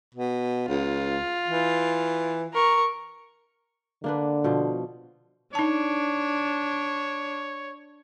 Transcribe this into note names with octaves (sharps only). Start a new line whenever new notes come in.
B2
C#2 F4
E3
A#4 C#6
D3 A#3 D4 B4
B2 F3
D4 D#4 C#5 A5